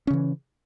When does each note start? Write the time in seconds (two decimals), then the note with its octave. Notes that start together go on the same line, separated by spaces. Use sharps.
0.07 C#4
0.10 C#3
0.13 E3